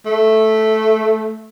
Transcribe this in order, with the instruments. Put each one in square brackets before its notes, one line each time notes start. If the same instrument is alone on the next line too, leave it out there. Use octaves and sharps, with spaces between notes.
[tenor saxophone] A3